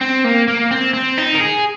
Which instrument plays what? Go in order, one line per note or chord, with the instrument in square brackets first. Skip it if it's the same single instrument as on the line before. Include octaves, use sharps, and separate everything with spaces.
[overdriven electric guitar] C4
A#3
A#3
C4
C4
D#4
A#4
G#4